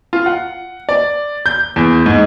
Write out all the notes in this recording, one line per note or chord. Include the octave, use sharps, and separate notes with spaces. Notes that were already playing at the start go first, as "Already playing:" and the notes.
F4
F#5
D5
G6
E2
G#2